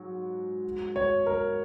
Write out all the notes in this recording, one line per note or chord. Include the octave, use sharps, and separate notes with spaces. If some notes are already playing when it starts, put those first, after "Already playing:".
Already playing: G#2 F#3
C#5
A#4